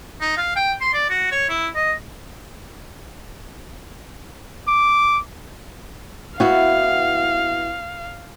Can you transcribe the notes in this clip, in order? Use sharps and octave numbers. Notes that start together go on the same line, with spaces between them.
D#4
F5
G5
C6
D5
F#4
C#5
E4
D#5
D6
B3 E4 F#4 F5